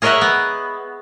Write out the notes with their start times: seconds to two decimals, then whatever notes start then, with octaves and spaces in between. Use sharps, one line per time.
0.02 G#4 A#4 C#5 D#5 E5 F#5
0.21 B3